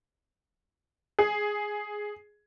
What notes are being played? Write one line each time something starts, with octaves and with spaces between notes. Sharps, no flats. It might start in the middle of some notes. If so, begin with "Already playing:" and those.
G#4